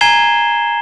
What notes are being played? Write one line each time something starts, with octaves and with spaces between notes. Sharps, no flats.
G#5 A#5 G#6 C7 E7 G7